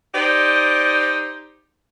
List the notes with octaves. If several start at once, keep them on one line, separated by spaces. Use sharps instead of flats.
D#4 G4 C5 D5